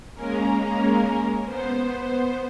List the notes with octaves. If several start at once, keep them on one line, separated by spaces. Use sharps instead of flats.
G#3 A#3 C#4 A#4
B3 C5